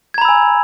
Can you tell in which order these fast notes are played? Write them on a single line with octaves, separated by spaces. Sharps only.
G#6 A#5 B5 E6 G#5